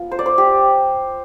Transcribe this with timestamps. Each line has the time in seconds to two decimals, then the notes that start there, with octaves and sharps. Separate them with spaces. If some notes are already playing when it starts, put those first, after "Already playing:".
Already playing: F3 B3 F4
0.11 C5
0.19 D5
0.26 C5
0.38 G4